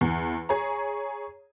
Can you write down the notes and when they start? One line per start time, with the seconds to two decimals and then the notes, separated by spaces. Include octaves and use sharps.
0.01 E2
0.49 G#4 C#5 A#5